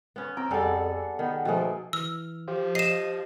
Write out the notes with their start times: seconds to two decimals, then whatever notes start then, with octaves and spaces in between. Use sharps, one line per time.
0.16 B3 C#4
0.37 C4 G5 A#5 E6
0.51 F2 G3 G#4 A4 D5 F#5
1.19 D#3 B3
1.45 B2 F3 A3 A#3 G#4 G5
1.93 E3 E6 F6
2.48 F3 G4 C5 F5
2.75 D#5 C7 E7